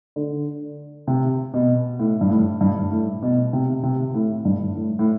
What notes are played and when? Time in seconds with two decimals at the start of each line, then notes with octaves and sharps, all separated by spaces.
0.16 D3
1.07 C3
1.54 B2
1.99 A2
2.21 G2
2.30 A2
2.61 G2
2.91 A2
3.22 B2
3.53 C3
3.83 C3
4.14 A2
4.45 G2
4.76 A2
4.99 A2